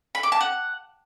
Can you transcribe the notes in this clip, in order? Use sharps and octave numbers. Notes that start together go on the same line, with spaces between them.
B5
D6
A5
F#5